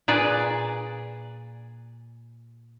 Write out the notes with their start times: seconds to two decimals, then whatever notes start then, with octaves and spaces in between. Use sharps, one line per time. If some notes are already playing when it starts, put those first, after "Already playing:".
0.08 A#2 G#4 B4 D5